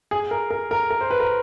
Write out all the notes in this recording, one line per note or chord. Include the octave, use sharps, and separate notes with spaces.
G#4
A#4
A#4
A#4
A#4
C5
B4
A#4